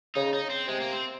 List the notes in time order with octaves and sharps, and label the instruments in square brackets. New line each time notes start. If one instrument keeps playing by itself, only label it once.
[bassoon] C#3 [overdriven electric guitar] D#4
[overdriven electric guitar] D#4
C4
[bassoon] C3 [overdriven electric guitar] G#3
[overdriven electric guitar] A#3
C4